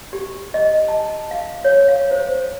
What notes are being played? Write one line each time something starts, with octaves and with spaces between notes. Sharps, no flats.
G4
D#5
A5
F5
C#5
F5
C5